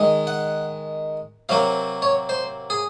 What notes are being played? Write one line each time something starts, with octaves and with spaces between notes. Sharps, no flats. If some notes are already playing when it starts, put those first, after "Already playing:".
Already playing: D#3 G#3
F#5
C3 F#3 A#3 F5
C#5
C5
G#4